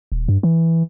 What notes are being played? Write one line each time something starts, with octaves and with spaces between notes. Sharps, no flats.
D#1
G2
E3